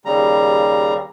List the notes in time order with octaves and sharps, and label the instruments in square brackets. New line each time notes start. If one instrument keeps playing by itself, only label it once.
[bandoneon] D#2 C#3 G3 A#5